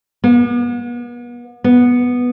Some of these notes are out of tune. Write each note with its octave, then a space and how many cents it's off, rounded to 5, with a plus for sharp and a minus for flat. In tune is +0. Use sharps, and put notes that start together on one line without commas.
B3 -40
B3 -5